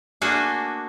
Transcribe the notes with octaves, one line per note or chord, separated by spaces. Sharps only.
A3 A#3 D4 F#4 G#4